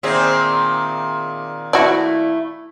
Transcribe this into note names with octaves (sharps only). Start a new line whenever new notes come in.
A#2 D#3 C4 G#4 C5 E5
A3 E4 F#4 D5